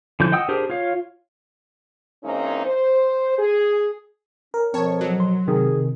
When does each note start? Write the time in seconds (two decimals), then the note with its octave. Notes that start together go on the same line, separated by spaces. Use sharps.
0.20 D3 E3 F3 G6
0.32 D#5 F#5 G5 D#6 E6
0.48 D4 G4 G#4 A#4 C5
0.70 F4 C#5 F5
2.23 E3 G#3 A#3 C4 C#4 D#4
2.65 C5
3.39 G#4
4.54 C#4 A#4
4.74 F2 B2 F3 C4 C#5 A5
5.01 F#3
5.20 C6
5.48 C3 D#3 G#4